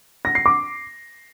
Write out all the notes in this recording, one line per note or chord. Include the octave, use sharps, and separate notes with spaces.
A#6
C7
D6